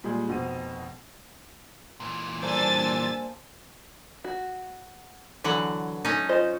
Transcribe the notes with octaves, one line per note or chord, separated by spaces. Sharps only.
A#2 G3 G#3 G#4
F1 B2 C4 D#7
A#2 E3
G3 A#3 D4 A4 C5 G#5 E6 A6
F#4
D3 E3 F#3 F#5
A3 C#4 D#4
F4 C5 D#5